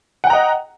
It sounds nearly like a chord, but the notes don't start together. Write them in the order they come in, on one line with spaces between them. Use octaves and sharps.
F#5 G5 A#5 D#5